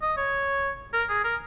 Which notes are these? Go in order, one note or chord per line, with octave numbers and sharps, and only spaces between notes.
D#5
C#5
A#4
G#4
A#4